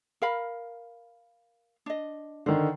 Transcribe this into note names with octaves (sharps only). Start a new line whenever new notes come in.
A#4 F5 B5
D4 D#5
D3 D#3 C5